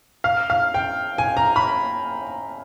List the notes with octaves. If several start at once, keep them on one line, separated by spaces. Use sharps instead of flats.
F5
F5
G5
G#5
A#5
B5